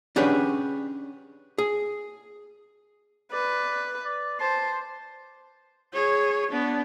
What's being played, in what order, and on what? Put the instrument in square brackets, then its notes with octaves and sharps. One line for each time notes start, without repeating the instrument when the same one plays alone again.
[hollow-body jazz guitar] C#4 D4 G4 G#4 B4 F#5
G#4
[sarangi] B4 [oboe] D5
[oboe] D5
[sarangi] C5 [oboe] A5
[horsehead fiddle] G#4 C#5
B3 D4